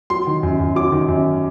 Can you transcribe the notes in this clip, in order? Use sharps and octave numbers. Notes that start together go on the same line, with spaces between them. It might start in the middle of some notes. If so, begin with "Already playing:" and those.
F#3 C6
D#3
F#2
F#2
F#3 D6
D#3
F#2